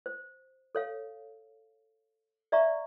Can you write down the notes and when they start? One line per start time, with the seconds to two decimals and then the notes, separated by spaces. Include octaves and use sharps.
0.06 C5
0.75 A4 C#5 F5
2.52 D5 E5 F5 A#5 C#6